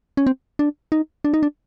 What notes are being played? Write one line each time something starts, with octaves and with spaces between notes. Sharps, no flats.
C#4
C4
D4
D#4
D4
D#4
D4